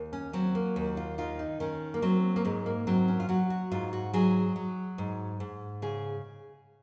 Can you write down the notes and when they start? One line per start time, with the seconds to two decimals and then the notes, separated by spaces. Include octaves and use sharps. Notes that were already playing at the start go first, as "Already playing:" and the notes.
Already playing: D#2
0.13 C#4
0.33 F#3 C4
0.55 A#3
0.76 D#2
0.97 F4
1.18 D#3 F4
1.39 D#4
1.60 D#3 C#4
1.94 A#3
2.02 F#3 C4
2.36 A#3
2.45 G#2 G#3
2.66 A#3
2.87 F#3 C4
3.08 C#4
3.20 F4
3.29 F#3 F#4
3.50 F#4
3.71 G#2 F4
3.93 F#4
4.13 F#3 G#4
4.56 F#3
4.98 G#2
5.40 G#2
5.82 C#3 G#4